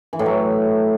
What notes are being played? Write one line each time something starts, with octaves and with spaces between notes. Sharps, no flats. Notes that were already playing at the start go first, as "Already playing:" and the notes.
E3
A2
F#3